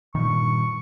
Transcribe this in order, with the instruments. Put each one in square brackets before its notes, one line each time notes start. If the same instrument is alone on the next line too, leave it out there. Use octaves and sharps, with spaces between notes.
[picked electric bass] G2 A#2 D#3 [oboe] C#6